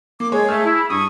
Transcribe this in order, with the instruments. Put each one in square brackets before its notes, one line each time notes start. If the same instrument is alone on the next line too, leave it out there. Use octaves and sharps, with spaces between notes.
[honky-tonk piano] A#3 [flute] D6
[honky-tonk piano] G#3 C#5 [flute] G#4
[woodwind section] A3 [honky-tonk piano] A5 E6 F6
[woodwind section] E4
[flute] B5
[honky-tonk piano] G2 [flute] C#6 [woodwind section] D#6